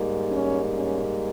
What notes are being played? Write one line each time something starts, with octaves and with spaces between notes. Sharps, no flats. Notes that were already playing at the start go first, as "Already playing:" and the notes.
Already playing: G#2 G3 A#3
C#4
C#4